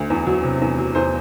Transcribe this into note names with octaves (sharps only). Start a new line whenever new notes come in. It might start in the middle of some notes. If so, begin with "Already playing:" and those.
Already playing: D2
E2
F#3
C3
E2
F#3
E2 C5